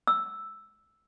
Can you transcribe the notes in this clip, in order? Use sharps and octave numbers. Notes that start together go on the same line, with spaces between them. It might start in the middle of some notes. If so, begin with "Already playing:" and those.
E6